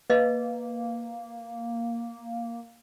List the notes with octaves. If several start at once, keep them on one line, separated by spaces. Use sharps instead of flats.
A#3 B4 D#5 F5